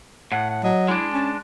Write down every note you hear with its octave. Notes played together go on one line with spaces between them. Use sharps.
A2 F#5
F#5
F#3 D#5
G#3 D4 E4
C#4 A5